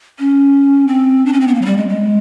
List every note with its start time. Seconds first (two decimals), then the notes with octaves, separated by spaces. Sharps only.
0.19 C#4
0.87 C4
1.26 D4
1.33 C#4
1.40 C4
1.47 B3
1.55 A#3
1.62 F#3
1.65 G3
1.77 G#3
1.89 G#3